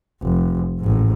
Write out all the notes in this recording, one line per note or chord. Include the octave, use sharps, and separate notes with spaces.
F1
A1 G#2